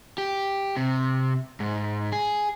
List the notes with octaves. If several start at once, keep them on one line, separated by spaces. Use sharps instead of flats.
G4
C3
G#2
G#4